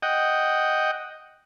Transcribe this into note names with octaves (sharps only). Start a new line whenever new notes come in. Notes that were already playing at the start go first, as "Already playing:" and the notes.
D#5 F#5 G5